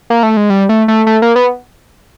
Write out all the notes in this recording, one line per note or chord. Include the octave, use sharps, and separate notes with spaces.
A#3
A3
G#3
G3
A3
A3
A3
A#3
B3